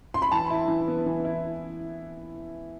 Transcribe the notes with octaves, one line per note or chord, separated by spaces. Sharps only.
C6
B5
E3 A5
E4
E3
B3
E3
E4